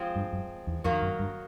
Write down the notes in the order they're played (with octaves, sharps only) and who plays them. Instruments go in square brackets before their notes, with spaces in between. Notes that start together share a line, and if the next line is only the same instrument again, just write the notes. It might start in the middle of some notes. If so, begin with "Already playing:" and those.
Already playing: [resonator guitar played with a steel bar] F3 G#3 C4 F4
[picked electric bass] G2
F#2
E2
[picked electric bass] F2 [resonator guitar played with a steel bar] D#3 F#3 A#3
[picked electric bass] F#2
G2